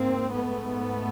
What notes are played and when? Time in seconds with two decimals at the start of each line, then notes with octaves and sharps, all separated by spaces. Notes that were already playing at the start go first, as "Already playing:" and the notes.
Already playing: G#2 A#3 C4
0.31 A3 B3